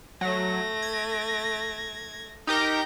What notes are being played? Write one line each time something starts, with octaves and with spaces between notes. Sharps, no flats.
F#3 A3 A#6
G#6
D#4 G4 A#4 G6 A#6